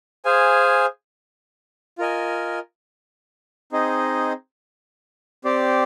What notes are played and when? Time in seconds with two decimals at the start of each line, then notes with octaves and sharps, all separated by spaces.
0.25 G#4 C5 F5 G#5
1.98 F4 A#4 D#5 G#5
3.72 C4 D#4 G#4 D#5
5.45 C4 G4 D5